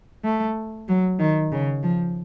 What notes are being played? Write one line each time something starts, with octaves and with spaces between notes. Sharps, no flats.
A3
F#3
D#3
C#3
F3